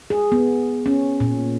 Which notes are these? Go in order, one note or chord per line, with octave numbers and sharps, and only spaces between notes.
G#4
B3
C#4
A#2